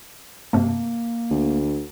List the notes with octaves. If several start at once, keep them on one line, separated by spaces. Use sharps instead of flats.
G2 C3 A3 A#3
D2